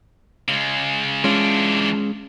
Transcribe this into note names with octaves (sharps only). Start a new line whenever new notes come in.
C#3 G#3
E3 G#3 C#4 D4 F4